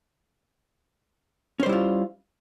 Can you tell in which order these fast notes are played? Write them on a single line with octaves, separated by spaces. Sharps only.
C#4 C5 G3 E4 F4